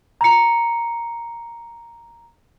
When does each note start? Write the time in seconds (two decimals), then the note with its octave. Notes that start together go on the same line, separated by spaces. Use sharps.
0.21 A#5 C#7